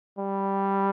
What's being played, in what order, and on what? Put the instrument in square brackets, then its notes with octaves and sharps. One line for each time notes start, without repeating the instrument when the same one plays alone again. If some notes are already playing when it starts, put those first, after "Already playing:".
[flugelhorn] G3